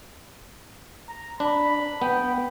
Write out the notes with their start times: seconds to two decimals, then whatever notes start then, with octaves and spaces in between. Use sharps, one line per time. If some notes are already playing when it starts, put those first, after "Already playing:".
1.08 A#5
1.40 D4 B5
2.02 B3 G5